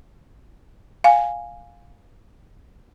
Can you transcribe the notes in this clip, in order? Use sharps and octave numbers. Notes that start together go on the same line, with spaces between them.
F5 G#5